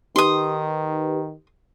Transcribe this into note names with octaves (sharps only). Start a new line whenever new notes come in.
D#3 D#4 G4 B4 C6 D#6